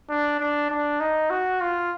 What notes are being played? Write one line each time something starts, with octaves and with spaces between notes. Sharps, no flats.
D4
D4
D4
D#4
F#4
F4